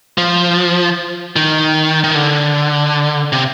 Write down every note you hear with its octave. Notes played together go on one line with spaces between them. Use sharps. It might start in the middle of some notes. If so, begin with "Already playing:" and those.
F3
D#3
D#3
D3
C3